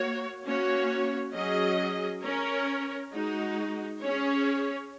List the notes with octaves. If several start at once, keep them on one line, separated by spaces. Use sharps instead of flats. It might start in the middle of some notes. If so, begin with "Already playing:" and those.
Already playing: A#3 F#4 C#5
A#3 C#4 F#4 C#5
F#3 C#4 G#4 D#5
C#4 A#4 C#5
G#3 D#4 F#4
C#4 G#4 C#5